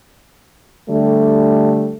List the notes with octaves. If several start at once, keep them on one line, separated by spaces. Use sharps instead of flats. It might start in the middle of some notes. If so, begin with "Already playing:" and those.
D3 G3 A3